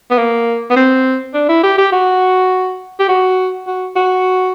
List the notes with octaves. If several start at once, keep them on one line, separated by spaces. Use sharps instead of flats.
B3
A#3
B3
C4
D4
E4
G4
G4
F#4
G4
F#4
F#4
F#4